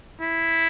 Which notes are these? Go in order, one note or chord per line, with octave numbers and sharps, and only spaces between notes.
E4